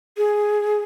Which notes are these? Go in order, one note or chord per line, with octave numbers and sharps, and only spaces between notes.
G#4